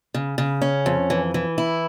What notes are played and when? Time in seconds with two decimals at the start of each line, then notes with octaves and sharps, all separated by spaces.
0.14 C#3
0.38 C#3
0.62 C#4
0.86 F2
1.10 E3
1.34 E3
1.58 E4